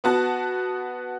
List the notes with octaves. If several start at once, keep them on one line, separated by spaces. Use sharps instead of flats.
B3 F#4 A5